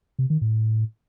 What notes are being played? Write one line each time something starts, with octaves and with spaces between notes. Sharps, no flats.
C3
D#3
A2